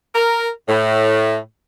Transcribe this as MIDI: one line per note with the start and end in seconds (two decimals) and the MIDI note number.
0.15 0.49 70
0.68 1.38 45